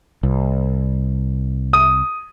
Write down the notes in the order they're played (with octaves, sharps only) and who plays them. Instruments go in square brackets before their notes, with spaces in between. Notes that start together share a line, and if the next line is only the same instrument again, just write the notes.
[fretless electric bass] C2
[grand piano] D#6